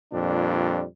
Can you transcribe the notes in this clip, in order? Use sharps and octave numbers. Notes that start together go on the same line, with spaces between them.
F2 A#2 G3 D4